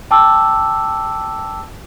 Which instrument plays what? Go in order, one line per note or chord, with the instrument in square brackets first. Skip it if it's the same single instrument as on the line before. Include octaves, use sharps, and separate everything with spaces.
[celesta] G5 A5 D6 E6